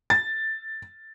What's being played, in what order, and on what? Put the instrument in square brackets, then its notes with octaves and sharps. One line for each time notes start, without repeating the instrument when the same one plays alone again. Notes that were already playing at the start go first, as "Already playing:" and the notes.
[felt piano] A6